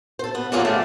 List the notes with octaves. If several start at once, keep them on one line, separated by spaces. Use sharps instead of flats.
A4 C5
B3
F#3 G3 A#3 F4 G#4
D3 F3 G3 A3